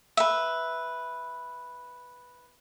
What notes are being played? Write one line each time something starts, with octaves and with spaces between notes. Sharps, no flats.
B4 E5